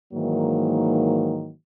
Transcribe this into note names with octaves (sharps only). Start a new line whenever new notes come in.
G#2 D#3 E3 F#3 A#3